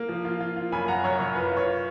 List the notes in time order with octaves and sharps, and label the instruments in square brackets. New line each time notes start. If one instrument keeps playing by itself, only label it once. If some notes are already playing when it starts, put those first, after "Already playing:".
Already playing: [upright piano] A#3
F3
F4
F4
F4
F#2 G#5 B5
F#2 F#5 A#5
F#2 C#5
F#2 C#5
F4 B4
F4 C#5